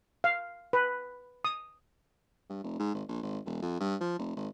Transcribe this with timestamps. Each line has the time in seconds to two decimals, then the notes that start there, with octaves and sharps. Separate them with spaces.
0.24 F5
0.73 B4
1.45 D#6
2.50 G2
2.64 F1
2.79 G#2
2.95 G#1
3.09 A#1
3.23 G#1
3.46 E1
3.62 F2
3.80 G2
4.01 F3
4.19 F1
4.37 G#1